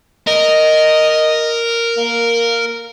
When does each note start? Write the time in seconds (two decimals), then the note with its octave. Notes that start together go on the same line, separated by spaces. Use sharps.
0.27 A#4 D#5
1.97 A#3